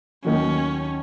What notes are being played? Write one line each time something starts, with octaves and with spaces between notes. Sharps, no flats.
D#2 D#3 F#3 C#4